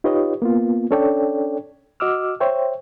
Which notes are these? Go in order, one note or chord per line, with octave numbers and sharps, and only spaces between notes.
D#4 F4 G4 B4 C#5 D#5
A#3 B3 F4
C#4 D4 A4 C#5 D5 G5
F#4 D#5 D6 E6 F6
C5 C#5 E5 G5